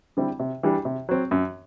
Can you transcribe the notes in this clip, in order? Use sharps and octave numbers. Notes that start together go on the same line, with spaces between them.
D3 G3 C4 E4
C3
E3 G3 D4 G4
C3
F#3 C4
F#2